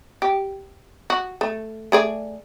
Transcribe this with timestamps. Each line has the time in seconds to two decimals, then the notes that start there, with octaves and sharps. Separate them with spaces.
0.22 G4
1.10 F#4
1.41 A3
1.92 A3 G#4 D5